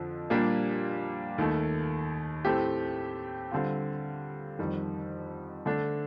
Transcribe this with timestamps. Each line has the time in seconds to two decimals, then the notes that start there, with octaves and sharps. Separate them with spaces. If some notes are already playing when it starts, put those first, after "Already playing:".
Already playing: F2 D3 F3
0.30 A#2 G3 A#3 D4 G4
1.38 D#2 D#3 A3
2.45 A2 A3 C4 G4
3.51 D3 G3 C4 F4
4.59 F2 D#3 G3
5.66 D3 A3 D4